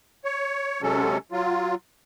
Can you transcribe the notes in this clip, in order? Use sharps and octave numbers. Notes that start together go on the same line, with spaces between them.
C#5
C3 F#3 G#3 C#4 A4
F#3 F4